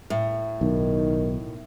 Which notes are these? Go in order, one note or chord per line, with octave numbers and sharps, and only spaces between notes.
A2
B1 D#3